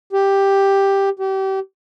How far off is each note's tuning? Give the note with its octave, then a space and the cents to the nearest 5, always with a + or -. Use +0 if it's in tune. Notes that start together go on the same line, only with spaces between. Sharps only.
G4 +5
G4 -30